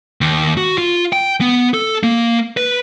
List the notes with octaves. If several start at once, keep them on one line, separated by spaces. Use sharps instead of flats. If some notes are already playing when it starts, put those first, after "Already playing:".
D#2
F#4
F4
G5
B3
A4
A#3
B4